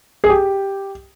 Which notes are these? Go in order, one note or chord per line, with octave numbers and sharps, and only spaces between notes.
G#4
G4